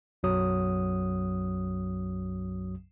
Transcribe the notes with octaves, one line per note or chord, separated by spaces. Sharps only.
B1 F#2 F#3 D#6